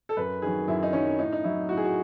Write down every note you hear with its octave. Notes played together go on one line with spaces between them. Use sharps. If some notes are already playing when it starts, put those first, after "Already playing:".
A4
F#2 B4
D#3 F#3 G#4
F#2 E4
D#4
D#3 F#3 C#4
A2 D#4
D#4
F#3 E4
A2 F#4
G#4
F#4